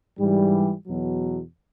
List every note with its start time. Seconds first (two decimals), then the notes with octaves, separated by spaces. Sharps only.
0.19 G#2 E3 G3
0.87 E2 B2 F#3